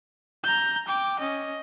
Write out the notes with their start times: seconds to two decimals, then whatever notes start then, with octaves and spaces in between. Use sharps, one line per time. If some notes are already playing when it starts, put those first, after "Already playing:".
0.44 A#5 G6
0.87 G5 D6
1.20 C#4 D#5